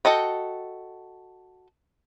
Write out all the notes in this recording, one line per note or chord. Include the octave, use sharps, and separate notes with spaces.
F#4 A4 D#5 G5